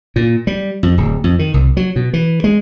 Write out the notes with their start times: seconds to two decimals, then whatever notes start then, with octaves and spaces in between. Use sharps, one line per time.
0.16 A#2
0.47 G3
0.83 F2
0.97 D1
1.24 F2
1.39 D#3
1.54 C2
1.77 F#3
1.96 B2
2.13 E3
2.44 G#3